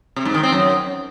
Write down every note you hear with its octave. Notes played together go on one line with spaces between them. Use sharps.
C3
G#2
D#3
C4
F#2